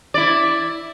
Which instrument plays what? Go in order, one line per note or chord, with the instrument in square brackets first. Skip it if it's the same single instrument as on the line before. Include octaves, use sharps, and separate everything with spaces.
[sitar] E4 D5